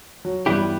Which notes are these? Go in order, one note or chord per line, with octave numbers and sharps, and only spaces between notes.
F#3
G2 E3 G3 B3 E4 G4
G3